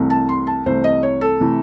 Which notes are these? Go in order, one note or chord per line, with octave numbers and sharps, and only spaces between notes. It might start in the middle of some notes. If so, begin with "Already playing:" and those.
Already playing: C2 C3 E3 A3
A5
C6
A5
C2 C3 E3 A3 C5
D#5
C#5
A4
C3 E3 A3